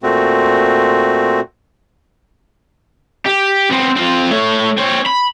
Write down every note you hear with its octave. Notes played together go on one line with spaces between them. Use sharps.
A#2 A3 C4 F#4
G4
B3 C4
C4 F4
A3 C#5
C4 C#5
B5